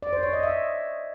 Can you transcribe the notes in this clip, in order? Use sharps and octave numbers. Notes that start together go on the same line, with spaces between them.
D5
C5
C#5
D#5
E5